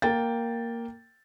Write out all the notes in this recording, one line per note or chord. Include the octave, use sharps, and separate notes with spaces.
A#3 G5 A6